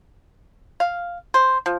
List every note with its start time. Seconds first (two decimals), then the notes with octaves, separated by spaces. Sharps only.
0.80 F5
1.34 C5
1.66 F3